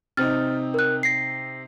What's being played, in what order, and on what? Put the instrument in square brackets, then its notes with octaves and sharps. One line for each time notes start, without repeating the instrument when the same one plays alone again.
[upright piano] C3 C4 D#4 [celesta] F6 A6
[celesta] A#4 F#6
A#6 C7